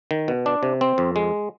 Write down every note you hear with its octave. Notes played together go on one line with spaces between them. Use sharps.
D#3
B2
D4
C3
C4
F2
G#3